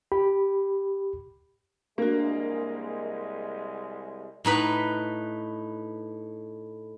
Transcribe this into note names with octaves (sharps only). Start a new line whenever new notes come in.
G4 B5
C2 G#3 A#3 D4 F#4
A2 D#4 B4 B5